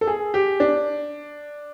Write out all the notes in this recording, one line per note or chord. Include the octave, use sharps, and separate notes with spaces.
A4
G#4
G4
D4